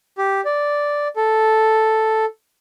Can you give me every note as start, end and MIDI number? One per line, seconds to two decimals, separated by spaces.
0.18 0.41 67
0.45 1.08 74
1.16 2.25 69